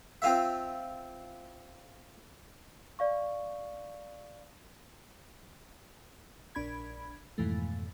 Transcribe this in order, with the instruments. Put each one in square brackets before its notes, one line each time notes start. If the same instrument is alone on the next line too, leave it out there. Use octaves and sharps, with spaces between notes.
[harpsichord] C4 F4 E5
[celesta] D5 F5 C#6
[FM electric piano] A#1 D4 B5 G#6
F2 G#2 B2 E3 A3